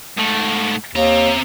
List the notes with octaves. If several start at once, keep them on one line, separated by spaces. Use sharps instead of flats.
G#2 A3
D#2 C3 A#5